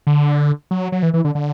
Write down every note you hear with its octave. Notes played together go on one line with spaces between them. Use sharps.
D3
F#3
F#3
E3
E3
D3
D3